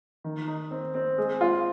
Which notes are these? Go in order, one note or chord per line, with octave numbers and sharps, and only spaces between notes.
D#3
D#4
C4
C4
G#3
F4